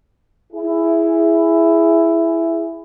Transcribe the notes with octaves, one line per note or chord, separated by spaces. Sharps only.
E4 G#4